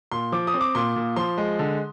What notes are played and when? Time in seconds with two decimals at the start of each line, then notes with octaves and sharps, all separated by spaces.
0.12 A#2 C6
0.32 F3 D6
0.47 D#6
0.54 C4
0.61 D6
0.75 A#2 C6
0.96 A#2
1.16 F3 C6
1.38 G#3
1.59 D3